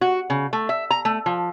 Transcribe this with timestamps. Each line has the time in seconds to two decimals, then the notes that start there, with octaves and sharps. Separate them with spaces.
0.01 F#4
0.30 C#3
0.53 A3
0.69 E5
0.91 A#5
1.05 A3
1.26 F3